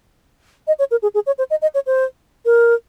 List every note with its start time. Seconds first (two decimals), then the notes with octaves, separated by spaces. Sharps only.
0.67 D#5
0.79 C#5
0.91 A#4
1.02 G#4
1.14 G#4
1.27 C#5
1.38 C5
1.50 D#5
1.62 D#5
1.74 C#5
1.87 C5
2.45 A#4